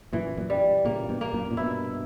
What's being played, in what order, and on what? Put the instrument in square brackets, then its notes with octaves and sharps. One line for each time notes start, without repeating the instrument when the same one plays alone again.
[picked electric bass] F#2 A#2 [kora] E3
[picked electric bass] F#2 A#2
[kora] G3
[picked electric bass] A#2 C#3 [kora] A#3
[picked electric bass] G2 B2
[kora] A#3
[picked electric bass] F#2 A#2
A#2
[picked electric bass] G2 B2 [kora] E4